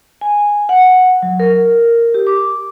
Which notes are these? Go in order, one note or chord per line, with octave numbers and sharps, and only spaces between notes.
G#5
F#5
F#3
A#4
G4
D6